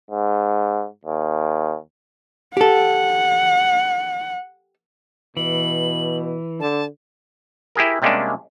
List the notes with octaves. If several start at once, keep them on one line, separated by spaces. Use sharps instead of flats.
G#2
D#2
G4 A4 F#5
B2 E3 F#7
D3 A5
E4 G4 G#4 A#4
C3 G3 G#3 A#3 C#4 D4